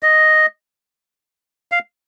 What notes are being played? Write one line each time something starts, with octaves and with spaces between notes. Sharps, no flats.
D#5
F5